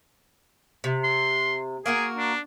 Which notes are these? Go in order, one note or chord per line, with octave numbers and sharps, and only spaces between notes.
C3
C6
A#3 F#4 G#4 A#4
D4